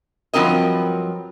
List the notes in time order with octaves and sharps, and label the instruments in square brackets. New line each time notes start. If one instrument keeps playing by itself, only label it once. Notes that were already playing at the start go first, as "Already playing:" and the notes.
[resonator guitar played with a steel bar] G2 F3 F#3 C4 A#4 D#5